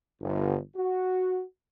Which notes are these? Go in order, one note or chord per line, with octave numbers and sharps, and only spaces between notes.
G1
F#4